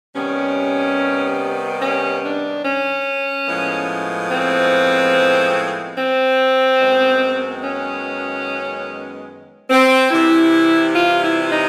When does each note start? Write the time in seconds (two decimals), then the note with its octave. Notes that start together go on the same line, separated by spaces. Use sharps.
0.14 C3 D#3 G3 B3 C#4
1.80 C#4
2.23 D4
2.64 C#4
3.47 A2 F3 G#3 B3
4.29 C4
5.96 C4
6.79 F#2 D#3 G#3 B3
7.62 C#4
9.70 C4
10.11 C3 E3 G3 E4
10.95 F4
11.22 E4
11.50 D#4